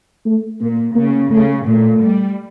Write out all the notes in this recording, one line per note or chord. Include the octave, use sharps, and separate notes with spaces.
A3
A#2 A#3
C#3 A#3
C#3 A3
A#2 A3
G3